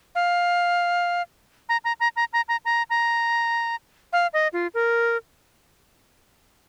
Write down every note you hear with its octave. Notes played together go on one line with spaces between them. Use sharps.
F5
A#5
A#5
A#5
A#5
A#5
A#5
A#5
A#5
F5
D#5
F4
A#4